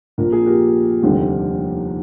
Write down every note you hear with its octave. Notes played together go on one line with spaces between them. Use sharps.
A#1 A#2 F3 A#3 A#4
G#4
G4 A#4
F1 D#2 D3 G3 C4